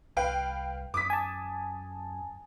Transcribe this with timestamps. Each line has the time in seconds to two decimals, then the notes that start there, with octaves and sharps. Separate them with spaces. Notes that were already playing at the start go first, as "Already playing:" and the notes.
0.17 C2 B4 F5 G5
0.94 F#2 D6 D#6 B6
1.10 G#5 A5